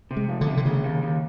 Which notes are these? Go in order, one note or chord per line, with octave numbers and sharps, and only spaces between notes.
C3
G#3
F2
D3
C3
D3
D#2 C#3
D#2
D#2